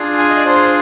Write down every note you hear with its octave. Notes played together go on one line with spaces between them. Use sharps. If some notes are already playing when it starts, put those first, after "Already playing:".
Already playing: D4 F4 G#4
G#5
D#5
D5
D4 F4 G#4 C5